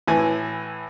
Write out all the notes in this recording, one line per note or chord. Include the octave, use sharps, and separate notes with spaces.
A2 E3 G#5